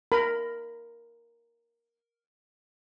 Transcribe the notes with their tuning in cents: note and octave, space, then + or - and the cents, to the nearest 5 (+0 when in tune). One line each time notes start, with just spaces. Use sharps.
A#4 +0 B5 +25